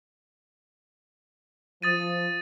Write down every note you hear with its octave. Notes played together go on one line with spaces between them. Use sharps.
F3 D#6 A6 D#7